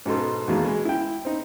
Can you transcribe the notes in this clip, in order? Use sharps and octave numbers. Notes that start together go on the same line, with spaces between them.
G#2 B2 D#4 A4 C6
E2 B2 D#3 A3 A#3 G#4
G#3
E4 G5
C4 D#4